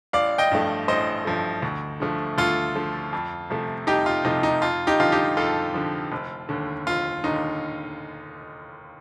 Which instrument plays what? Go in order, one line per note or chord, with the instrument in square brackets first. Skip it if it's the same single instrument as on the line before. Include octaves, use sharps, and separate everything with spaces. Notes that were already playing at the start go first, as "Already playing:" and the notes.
[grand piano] A1 D5 F5
D#5 G5
G2 F3 A3
A1 C5 D#5
G2 F3 A3
D2
D3 F3 A3
D2 F4 A4
D3 F3 A3
F2
C3 F3 A3
F2 D#4 G4
F4
C3 F3 A3 D#4
D#4
F2 F4
D#4 G4
D3 F3 F4
D#4 G4
F2 F4 A4
D3 F3
F1
D#2 D3
F1 F4
D#2 D3 D#4